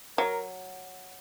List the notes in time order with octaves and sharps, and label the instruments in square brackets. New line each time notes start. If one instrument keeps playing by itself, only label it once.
[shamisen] F#3 [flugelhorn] A#4